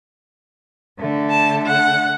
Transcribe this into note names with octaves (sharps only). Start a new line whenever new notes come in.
D3 A3
A5
F#5